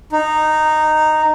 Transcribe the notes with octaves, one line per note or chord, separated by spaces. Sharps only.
D#4